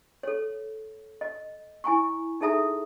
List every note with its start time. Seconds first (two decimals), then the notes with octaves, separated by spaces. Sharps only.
0.23 A4 C#5
1.21 D#5
1.84 E4 G#5 A#5 C#6
2.41 D#4 G#4 A4 E5 A#5 D#6